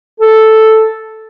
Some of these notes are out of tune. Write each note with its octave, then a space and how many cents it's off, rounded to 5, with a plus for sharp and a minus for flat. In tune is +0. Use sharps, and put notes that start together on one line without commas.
A4 +0